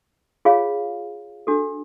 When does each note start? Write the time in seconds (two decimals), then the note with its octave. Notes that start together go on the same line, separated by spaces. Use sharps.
0.45 F4 G#4 C#5 F5
1.47 D4 F#4 A4